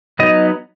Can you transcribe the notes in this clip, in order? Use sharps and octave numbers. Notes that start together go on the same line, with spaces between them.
F#3 B3 D#4 D#5